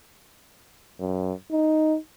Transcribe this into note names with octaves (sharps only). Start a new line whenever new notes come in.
F#2
D#4